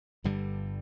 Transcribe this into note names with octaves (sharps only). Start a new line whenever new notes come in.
G1 G2 D3 G3